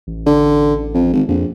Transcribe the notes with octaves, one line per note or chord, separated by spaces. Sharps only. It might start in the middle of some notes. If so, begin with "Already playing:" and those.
A1
D3
F2
G#1
A#1 F2